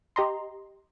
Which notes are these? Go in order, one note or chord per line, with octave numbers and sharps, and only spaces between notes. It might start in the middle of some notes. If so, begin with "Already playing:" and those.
G4 D#5 A#5 C6